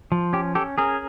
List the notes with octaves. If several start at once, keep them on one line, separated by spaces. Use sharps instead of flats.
F3
C#4 G4
C#4 G4 A4
C#4 G#4 A#4